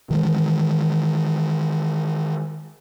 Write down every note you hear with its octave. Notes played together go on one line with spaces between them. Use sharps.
D#3 E3 G#3